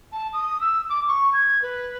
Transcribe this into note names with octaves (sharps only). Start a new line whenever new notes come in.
A5
D#6
E6
D6
C#6
G#6
B4